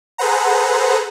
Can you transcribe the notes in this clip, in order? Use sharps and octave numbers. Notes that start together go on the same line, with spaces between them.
G#4 A4 B4 C5 F#5 A#5